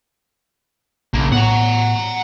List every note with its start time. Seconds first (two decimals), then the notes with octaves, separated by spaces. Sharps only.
1.14 A#1 C#3 A#3
1.32 A2 B3 F#5 A#5